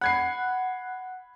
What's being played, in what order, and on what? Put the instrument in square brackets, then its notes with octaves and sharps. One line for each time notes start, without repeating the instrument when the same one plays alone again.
[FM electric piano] F#5 [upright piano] B5 G#6 C7